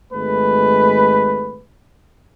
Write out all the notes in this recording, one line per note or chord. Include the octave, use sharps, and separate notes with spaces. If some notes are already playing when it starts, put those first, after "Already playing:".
G#1 G#3 A3 B4